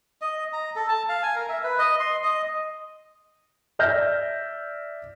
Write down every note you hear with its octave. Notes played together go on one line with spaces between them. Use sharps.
D#5
A#5
A4
A5
F5
G#5
A#4
E5
B4
D#5
C6
D#5
D5 E5 F6 G6 A#6